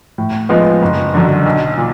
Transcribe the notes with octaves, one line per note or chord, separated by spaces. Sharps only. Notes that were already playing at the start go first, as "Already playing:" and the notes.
A2
F3 G#3 B3 D#4
F#1
F#2 D3
B1
A#2